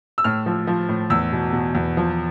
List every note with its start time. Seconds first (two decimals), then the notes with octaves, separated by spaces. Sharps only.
0.18 E6
0.24 A2 F6
0.46 F3
0.67 F3
0.89 A2
1.10 E2 E6
1.32 B2
1.53 B2
1.75 E2
1.97 F3